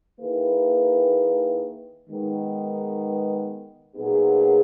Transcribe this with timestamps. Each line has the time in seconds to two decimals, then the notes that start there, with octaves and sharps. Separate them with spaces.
0.19 D#3 A#3 E4 G#4 B4
2.08 D#3 G#3 B3
3.95 A#2 F#3 B3 D#4 G#4